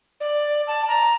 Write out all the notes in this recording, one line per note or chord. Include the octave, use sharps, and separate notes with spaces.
D5
A5
A#5